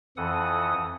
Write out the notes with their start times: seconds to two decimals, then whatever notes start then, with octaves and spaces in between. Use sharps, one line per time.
0.17 F2 E3 A4 F#5 D#6